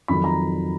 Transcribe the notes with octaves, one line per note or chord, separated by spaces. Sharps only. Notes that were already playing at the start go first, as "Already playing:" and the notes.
F2 D#3 F#3 B5
A#5